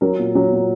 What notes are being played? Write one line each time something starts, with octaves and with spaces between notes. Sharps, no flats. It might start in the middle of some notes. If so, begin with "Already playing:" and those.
F#3 A#4
A#2
F#3
A#2